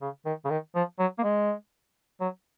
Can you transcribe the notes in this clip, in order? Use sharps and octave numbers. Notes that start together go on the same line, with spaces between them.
C#3
D#3
C#3
D#3
F3
F#3
A#3
G#3
F#3